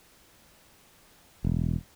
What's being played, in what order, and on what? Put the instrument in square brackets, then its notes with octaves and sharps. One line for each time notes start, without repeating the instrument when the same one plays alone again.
[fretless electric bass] E1